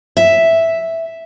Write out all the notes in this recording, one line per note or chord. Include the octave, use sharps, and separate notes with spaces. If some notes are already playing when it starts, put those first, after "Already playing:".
E5